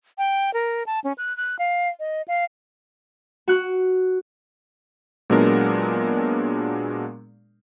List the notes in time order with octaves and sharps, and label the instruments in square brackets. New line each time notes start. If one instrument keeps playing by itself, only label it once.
[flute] G5
A#4
A5
C#4
F#6
F#6
F5
D#5
F5
[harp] F#4 F#6
[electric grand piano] A#2 F#3 G#3 B3 D4 A#4